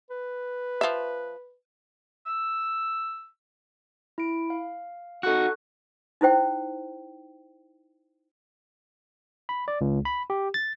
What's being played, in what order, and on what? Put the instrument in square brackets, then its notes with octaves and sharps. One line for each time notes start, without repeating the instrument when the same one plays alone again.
[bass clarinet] B4
[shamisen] F3 E5
[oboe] E6
[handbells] E4 D7
F5
[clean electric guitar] D#4 F#4 [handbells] A4 C#6 F#6
[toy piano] D#4 E4 C5 G5
[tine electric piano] B5
D5
C#2
B5
G4
A6